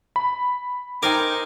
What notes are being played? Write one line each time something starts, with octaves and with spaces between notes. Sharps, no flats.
B5
D#4 A#4 C5 G5 G#5 D6